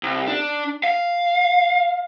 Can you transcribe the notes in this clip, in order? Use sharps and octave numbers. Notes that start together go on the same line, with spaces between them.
C2
D4
F5